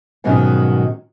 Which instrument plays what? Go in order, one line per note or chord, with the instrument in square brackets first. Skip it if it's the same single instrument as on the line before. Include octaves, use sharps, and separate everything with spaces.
[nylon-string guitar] G#2 B2 D#3 F#3 G3 C#4